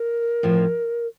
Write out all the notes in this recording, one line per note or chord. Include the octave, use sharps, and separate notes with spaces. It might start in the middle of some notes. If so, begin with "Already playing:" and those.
Already playing: A#4
A2 F3 C#4